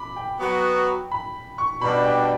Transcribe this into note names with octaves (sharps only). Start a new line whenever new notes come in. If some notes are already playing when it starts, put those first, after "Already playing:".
Already playing: B5 D6
G5
F#3 B3 F#4
B5
C#6
B2 G3 D4 B5
G5